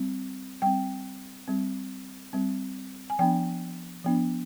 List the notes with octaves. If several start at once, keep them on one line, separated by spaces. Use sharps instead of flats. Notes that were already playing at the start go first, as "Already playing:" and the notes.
Already playing: G3 C4
G3 C4 G5
G3 C4
G3 C4
G#5
F3 B3 D4 G5
F3 B3 D4